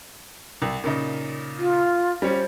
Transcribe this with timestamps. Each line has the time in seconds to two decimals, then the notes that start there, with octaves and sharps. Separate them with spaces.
0.62 C2
0.84 A#2 C#3 D#4
1.57 F4
2.22 G3 C#4 C5